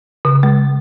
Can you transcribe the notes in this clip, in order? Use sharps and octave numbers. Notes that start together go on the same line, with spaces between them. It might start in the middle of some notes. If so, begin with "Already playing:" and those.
C#3
G#3